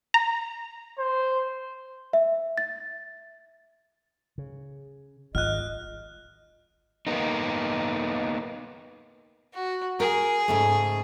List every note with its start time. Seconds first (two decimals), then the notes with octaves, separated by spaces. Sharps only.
0.14 A#5
0.98 C5
2.13 E5
2.58 A6
4.38 C#3
5.35 G#1 G#3 F4 D#5 F6 F#6
7.07 A#3 B3 D#4
9.54 F#4
10.00 G#4 A#4
10.48 G#2 C#3 A3